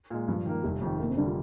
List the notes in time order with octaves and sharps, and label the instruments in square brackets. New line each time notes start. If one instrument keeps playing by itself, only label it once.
[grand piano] A#2 G#3
[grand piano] G2 [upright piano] F3
[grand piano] D#3 A#3
[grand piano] F1 [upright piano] G3
[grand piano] F2 D#3
[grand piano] F1 [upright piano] A#3
[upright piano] C4
[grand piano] D3 G3 A#3 [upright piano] D4
[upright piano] F4